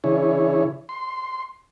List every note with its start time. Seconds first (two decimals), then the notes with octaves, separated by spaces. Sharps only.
0.04 C#3 E3 D4 E4 G#4 C#5
0.89 C6